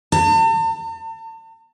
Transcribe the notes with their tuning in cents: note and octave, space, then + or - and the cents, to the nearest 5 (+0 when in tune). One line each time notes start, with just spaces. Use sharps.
A5 +45